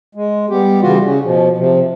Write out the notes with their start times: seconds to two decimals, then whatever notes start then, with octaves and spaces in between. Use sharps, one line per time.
0.15 G#3
0.50 G3 B3 G4
0.82 C#3 E3 G3 F4 F#4
1.05 C#3 C#4
1.23 B2 F3
1.58 C3 F3